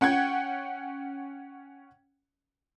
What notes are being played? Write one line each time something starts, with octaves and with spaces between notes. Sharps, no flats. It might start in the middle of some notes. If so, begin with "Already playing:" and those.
C#4 F#5 G5 G#6